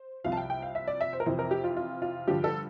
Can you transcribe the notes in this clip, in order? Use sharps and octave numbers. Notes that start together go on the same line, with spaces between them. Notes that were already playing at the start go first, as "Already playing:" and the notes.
Already playing: C5
C2 C3 F3 F5
A5
G5
G5
F5
E5
D5
E5
C5
A#4
F2 C3 E3 C5
A#4
G4
F4
F4
F4
G2 D3 F3 G4
A4